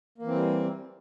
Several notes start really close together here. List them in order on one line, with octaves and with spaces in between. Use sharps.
A#3 E3 C4 G3